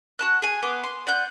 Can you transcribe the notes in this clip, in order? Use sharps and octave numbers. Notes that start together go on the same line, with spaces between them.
F#4 A5 F#6
G#4 G#5
B3 C6 D6
C6
D5 F#5 F#6 G6